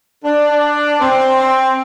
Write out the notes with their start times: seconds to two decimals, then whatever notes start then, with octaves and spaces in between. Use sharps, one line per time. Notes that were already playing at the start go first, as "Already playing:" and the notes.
0.25 D4
1.00 C4